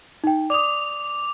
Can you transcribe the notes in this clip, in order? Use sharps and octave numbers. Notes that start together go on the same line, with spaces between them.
D#4 G5
D5 D6 D#6 F7